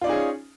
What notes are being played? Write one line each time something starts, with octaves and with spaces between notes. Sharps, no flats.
C#4 D#4 F4 G#4 D5